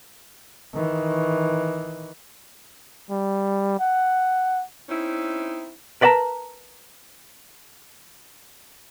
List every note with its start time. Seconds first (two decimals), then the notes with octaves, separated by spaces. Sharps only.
0.74 D#3 E3
3.10 G3
3.79 F#5
4.89 C4 C#4 D#4 E4
6.01 A#4 B4 D5 F#5 A5 A#5